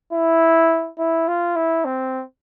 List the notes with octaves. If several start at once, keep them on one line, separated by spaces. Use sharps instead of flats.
E4
E4
F4
E4
C4